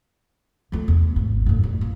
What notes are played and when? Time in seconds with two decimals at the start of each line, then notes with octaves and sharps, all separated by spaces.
0.72 F3 A3
0.88 E2
1.16 G#1
1.46 F#2 A2
1.63 A1
1.81 A#3